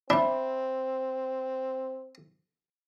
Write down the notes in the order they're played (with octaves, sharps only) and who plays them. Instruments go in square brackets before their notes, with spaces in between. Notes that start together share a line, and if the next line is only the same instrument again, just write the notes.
[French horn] C4 [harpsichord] D4 [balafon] E5 B5